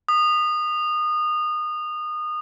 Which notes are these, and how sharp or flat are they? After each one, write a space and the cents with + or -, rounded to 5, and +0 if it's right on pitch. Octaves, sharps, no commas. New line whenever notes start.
D#6 -25